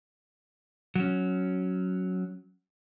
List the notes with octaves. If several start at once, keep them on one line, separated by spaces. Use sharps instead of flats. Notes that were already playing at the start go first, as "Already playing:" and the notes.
F#3 C#4